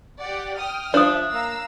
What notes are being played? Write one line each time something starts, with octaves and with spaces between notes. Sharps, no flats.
G4 D5 F#5
G5 D#6 F6
F3 D4 C#5 E5 D#6
A#3 F5 A#5 E6